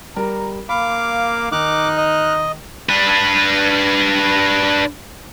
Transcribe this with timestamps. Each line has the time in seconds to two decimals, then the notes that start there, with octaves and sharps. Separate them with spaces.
0.16 G3 A#4 A#5
0.69 A#3 F5 B5 D6
1.52 D#3 D#4 D6 F6 F#6
1.97 D#5
2.89 D4 B4